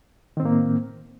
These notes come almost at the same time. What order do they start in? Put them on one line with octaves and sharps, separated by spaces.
D#3 C4 A2 A#3